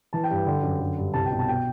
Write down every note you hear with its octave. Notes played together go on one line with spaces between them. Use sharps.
E3 A5
G5
G2
D3 G5
F#2
D3
G2
C2 A5
G5
B2
A5
B2 G5